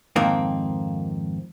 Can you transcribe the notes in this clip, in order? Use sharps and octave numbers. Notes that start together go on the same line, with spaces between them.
F2 G#2 D#3 A#3 C4